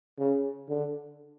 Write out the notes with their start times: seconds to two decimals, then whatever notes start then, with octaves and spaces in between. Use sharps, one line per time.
0.19 C#3
0.69 D3